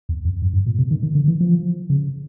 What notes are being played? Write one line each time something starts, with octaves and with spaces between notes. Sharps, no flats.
E2
F2
F#2
G2
A#2
C3
D#3
D#3
D3
E3
F3
C#3